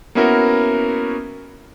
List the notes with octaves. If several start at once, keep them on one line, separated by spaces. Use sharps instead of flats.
A#3 B3 C#4 E4 F#4 A#4